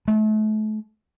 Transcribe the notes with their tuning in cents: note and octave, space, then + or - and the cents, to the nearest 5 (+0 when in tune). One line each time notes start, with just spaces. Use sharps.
A3 -35